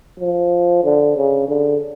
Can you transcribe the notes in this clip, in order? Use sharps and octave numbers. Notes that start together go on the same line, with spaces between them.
F3
D3
C#3
D3